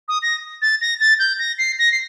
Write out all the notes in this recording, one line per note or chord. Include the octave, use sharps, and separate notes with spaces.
D#6
A#6
A6
A#6
A6
G6
A#6
C7
A#6
C7